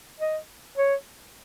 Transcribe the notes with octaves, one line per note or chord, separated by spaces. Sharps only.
D#5
C#5